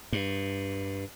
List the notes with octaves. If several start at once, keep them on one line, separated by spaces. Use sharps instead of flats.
G2